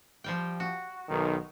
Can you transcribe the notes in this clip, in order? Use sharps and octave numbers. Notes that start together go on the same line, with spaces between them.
F3 G3 G5
F#4
B1 D#3